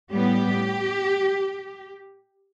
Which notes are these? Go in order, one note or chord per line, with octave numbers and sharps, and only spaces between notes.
A2 G3 B3 G4